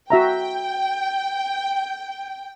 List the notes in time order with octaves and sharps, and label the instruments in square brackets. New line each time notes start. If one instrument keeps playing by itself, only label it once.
[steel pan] F#4 E5 A#5 [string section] G5